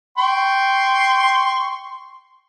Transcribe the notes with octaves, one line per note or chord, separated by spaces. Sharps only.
G5 C6 C#6